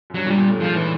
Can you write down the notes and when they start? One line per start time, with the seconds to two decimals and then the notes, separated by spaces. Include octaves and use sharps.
0.10 F#2
0.14 G2 F#3
0.26 A#2
0.30 G3
0.38 A#2
0.49 A2
0.61 G#2 F3
0.76 E3